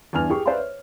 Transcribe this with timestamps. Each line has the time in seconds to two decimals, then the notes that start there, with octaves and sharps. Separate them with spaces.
0.13 E2 G2 G#5 F6 F7
0.30 G4 G#4 C#6
0.46 B4 C5 D5 E5 F5 C6
0.58 C#5